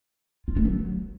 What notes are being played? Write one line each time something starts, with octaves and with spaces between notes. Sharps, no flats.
F4
A3
F#3